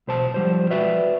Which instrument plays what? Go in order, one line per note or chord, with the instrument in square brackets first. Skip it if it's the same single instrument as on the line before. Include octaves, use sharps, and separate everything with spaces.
[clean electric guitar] B1 C5 A5
F3 G3 C5
F#4 B4 D5 E5